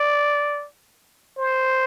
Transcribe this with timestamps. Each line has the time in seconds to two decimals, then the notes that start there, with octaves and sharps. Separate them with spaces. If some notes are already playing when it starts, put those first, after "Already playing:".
Already playing: D5
1.37 C5